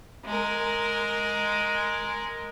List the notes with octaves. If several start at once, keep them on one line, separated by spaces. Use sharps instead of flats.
G#3 A#4